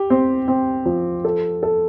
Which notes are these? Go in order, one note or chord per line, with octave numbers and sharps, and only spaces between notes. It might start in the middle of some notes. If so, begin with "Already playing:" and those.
Already playing: G4
C4
C4
F3
A4
A4